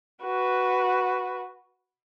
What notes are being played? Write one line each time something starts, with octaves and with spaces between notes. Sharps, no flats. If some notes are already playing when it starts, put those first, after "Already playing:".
F#4 B4